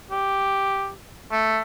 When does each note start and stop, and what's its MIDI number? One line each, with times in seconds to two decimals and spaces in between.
0.11 0.90 67
1.32 1.61 57